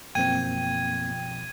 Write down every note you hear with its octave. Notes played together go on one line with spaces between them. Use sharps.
F#2 B2 F3 A#3 C4 G5 G#6 D#7